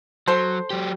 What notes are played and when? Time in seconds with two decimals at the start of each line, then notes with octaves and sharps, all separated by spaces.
0.28 F#3 A4 C5
0.70 F#3 G4